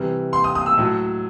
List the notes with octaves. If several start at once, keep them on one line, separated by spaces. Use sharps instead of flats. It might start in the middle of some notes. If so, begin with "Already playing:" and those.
Already playing: C3 E3 G3
C6
D#6
D#6
E6
A2 F#3